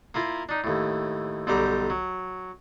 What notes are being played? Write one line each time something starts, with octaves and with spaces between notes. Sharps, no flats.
A#3 E4 F4 A#4
D4 D#4
D#2 A2
B1 D3 G3 G4 A#5 D6
F#3